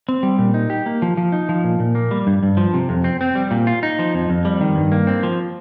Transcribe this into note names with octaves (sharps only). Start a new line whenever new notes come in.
C4
G3
A#2
D#4
G4
A#3
F3
F3
D#4
F3
A#2
A#2
A#3
G3
G2
G2
F3
C3
F2
C4
C4
G3
A#2
F4
D#4
F3
F2
F2
G3
D#3
G2
A#3
C4
F3